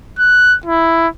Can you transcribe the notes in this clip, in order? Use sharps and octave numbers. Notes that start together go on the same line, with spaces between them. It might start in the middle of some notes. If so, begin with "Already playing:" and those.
F#6
E4